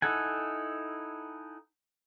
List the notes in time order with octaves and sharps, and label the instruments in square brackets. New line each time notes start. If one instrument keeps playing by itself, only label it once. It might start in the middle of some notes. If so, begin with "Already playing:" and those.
[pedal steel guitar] D#4 E4 A4 F#5 G#5